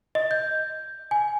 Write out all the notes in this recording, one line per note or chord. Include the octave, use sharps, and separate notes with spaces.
D#5
G6
G#5